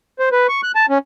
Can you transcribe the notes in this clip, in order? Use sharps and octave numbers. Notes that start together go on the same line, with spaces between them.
C5
B4
C#6
F#6
A5
C#4